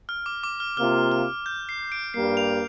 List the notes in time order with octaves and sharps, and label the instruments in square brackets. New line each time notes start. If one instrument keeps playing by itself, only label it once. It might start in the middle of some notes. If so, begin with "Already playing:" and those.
[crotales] F6
D6
D6
F6
[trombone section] C3 A#3 F4 [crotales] F6
[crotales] F6
G6
C7
D7
[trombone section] G2 G3 A#3 [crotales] C7
[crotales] F7